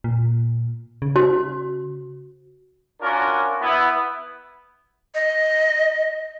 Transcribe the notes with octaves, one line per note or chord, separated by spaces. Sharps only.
A#2
C#3
F#4 C5
C#4 D4 F4 F#4 A#4
B3 E4
D#5